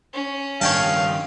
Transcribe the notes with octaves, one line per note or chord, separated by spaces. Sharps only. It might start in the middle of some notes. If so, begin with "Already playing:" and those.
C#4
G2 D#3 C#5 F5 G5 A5